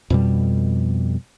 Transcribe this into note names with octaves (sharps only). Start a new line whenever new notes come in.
F2 B2 G3